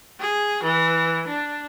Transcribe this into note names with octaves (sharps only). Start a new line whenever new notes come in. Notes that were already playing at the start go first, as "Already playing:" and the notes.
G#4
E3
D4